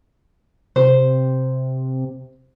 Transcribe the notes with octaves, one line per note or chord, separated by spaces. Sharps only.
C3 C5